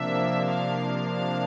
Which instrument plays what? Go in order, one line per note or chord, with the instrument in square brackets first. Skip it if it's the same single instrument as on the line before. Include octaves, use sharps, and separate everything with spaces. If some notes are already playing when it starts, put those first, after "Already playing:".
Already playing: [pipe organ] C3 F3 A#3 D4 E5
F5